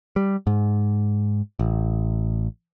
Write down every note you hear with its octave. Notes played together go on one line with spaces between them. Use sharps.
G3
G#2
A1